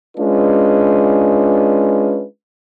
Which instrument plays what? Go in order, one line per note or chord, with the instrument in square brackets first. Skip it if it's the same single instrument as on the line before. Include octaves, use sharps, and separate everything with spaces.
[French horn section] G#3 C#4 D4 F4 B4